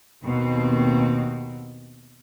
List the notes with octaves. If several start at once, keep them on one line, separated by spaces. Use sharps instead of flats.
D#2 B2 C4